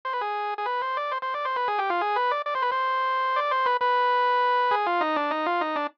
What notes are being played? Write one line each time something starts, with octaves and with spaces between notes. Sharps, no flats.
C5
B4
G#4
G#4
B4
C5
D5
C5
C5
D5
C5
B4
G#4
G4
F4
G#4
B4
D5
D5
C5
B4
C5
D5
C5
B4
B4
G#4
F4
D#4
D4
D#4
F4
D#4
D4